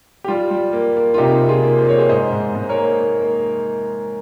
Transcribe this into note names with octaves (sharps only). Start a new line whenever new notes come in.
G4
G3 F4
G3
A#3
A#3
F4
C3 D#4 G4
C3
F4 G#4
A#3
C5
A#3 C#5
G#4 C5
G#2 C5 D#5
G#2
G#2
C5
A#4 C#5
A#3
A#3
A#3